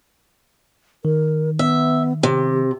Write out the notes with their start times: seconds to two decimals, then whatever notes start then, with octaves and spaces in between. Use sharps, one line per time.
1.05 D#3 A#4
1.59 B3 E5
2.23 C3 G4